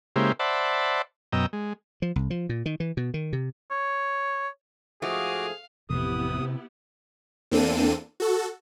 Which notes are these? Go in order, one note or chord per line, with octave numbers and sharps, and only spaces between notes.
C#3 G#3 A#3 E4 G4 C5
C5 D5 E5 F#5 A5 B5
F#2 B2 D#5 G5 A#5 E6
G#3
F3
C2
F3
A#2
D#3
E3
B2
D#3
C3
C#5
G#2 F3 A3 F#4 G#4 F5 D6 D#6
A1 F2 C3 B3 E4 G4 D#6
E2 A#3 C4 D4 A4 D#7
F#4 A4